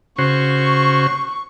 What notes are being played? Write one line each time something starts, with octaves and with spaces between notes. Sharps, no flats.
C#3 F#4 C5 C#6